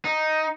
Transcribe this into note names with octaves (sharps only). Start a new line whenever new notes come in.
D#4